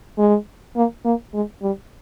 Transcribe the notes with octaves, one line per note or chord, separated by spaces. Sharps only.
G#3
A#3
A#3
G#3
G3